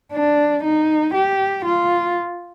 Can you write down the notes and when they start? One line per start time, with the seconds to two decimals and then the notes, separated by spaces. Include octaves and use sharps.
0.13 D4
0.63 D#4
1.14 G4
1.65 F4